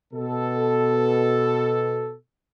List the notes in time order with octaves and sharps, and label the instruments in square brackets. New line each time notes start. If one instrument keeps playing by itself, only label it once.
[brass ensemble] B2 A4